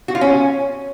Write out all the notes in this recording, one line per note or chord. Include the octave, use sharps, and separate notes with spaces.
F#4
F4
C#4